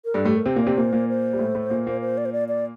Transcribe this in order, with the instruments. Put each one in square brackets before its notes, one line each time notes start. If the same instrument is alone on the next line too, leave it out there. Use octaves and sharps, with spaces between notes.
[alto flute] A#4
[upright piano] G2 G3 [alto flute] A4
[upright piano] A2 A3 [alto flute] G4
[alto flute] A#4
[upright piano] C3 C4 [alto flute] C5
[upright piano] A#2 A#3
[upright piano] C3 C4 [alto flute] D5
[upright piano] A#2 A#3 [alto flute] C5
[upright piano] A#2 A#3
[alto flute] C5
[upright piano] G3
A2 A3
A2 A3
A#2 A#3
A#2 A#3
[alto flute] C5
D5
C5
D5
D5